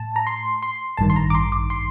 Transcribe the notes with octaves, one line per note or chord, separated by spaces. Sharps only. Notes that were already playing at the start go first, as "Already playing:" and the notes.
Already playing: A2 A5
A#5
C6
C6
A1 G2 D#3 A5
C6
A#5
D6
C6
D6
C6